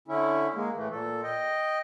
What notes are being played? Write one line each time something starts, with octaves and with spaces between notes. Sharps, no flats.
D3 C#4 E4
G#3 A#3
A2 E3 A3
A#2 A4
D#5 G5